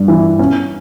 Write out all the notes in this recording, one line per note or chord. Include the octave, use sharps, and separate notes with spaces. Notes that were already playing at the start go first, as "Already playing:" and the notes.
Already playing: G2
E3
C#4